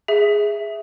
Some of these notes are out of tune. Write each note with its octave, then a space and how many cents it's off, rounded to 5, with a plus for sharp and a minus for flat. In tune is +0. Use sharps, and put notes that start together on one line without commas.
G#4 +0 E5 +0